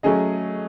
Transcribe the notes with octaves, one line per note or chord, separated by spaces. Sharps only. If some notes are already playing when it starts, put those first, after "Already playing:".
F#3 A3 C#4 G#4 D#5